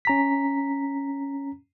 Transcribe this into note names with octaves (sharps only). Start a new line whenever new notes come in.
C#4 A#5 B6